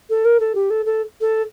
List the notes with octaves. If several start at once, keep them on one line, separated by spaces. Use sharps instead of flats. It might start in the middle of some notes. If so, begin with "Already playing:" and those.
A4
A#4
A4
G4
A4
A4
A4